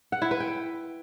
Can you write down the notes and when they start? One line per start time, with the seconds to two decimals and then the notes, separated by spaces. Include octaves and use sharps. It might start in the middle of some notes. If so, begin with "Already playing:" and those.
0.12 F#5
0.22 E4
0.31 B4
0.40 G5